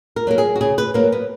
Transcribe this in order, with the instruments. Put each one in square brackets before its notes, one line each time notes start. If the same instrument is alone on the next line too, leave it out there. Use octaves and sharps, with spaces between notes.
[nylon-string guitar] A#4
F#3 A#3 A#4
G#4
F#4
C#3 G#4
B4
F#3 A#3 A#4
B3